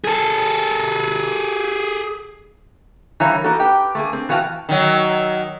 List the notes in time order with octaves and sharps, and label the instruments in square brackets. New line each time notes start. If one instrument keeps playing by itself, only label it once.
[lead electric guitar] G#4 A4
[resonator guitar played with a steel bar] E3 G3 A#4 C#5 F5
A#3 B3 D#4 F#4 A4
G4 B4 G5
A3 A#3 G#4
C4
E3 B3 F#4 F5 G5 A5
[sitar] D#3 F#3